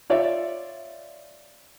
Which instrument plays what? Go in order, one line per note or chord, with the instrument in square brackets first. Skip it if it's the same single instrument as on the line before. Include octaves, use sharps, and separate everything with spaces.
[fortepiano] F4 C#5 D5 E5